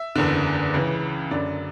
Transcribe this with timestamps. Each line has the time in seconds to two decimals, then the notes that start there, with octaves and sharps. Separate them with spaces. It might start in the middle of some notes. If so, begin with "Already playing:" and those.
Already playing: E5
0.16 F#1 E2 D3
0.74 C#2 C#3 E3
1.31 F#1 F#2 D3 D5